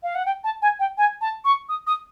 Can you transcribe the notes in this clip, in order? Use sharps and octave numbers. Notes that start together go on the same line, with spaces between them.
F5
F#5
G5
A5
G#5
G5
G#5
A5
C#6
D#6
D#6